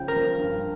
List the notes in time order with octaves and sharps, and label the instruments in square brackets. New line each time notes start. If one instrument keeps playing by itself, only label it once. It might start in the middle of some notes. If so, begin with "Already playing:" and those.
Already playing: [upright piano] C#3 F3 C#4 [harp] G5
[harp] A#4
[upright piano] F3
G2